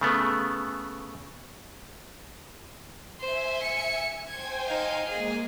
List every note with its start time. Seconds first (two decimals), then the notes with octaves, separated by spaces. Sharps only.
0.01 C#3 A3 B3
3.20 C5 E5 G#5
3.62 C#7
4.28 C5 G5 G#5 G#6
4.66 D#4 F5
5.09 G#3 A#3 G#4